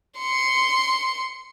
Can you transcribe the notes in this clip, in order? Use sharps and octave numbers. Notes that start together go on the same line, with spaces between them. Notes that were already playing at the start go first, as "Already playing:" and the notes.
C6 C#7